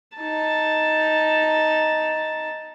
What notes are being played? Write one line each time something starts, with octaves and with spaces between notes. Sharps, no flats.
D#4 A5